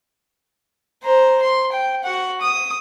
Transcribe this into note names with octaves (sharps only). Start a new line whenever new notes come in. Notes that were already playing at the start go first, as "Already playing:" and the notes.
C5 A#5
C6
G5
F#4 F#5
D#6